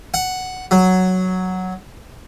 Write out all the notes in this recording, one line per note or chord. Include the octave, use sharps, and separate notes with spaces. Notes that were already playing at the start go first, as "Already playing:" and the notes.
F#5
F#3